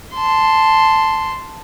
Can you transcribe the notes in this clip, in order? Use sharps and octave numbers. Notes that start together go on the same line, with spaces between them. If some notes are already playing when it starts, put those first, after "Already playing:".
A5 C6